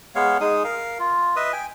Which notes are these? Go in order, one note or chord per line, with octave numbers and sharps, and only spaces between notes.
G#3 B3 C#5 F5
G#3 D#4 G#4 D#6
A#4 F5
F4
B4 D#5 E5 D#6
G5 G#5